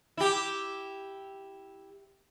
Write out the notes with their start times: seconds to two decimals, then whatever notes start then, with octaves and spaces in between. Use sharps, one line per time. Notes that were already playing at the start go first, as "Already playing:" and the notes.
0.17 E4 G4